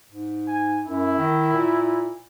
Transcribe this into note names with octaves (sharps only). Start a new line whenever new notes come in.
G#2
G#5
F#2 E4
D#3
A#2